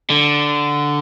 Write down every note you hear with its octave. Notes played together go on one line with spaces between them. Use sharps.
D3